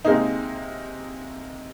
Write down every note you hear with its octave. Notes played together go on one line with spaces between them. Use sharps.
C3 G#3 A#3 D#4